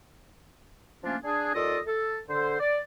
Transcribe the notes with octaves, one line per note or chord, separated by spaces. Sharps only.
F3 A3 A#3 C#4 D4 F4
D4 G#4
D#2 F4 A4 D5 D#5
A4
D3 C5
D5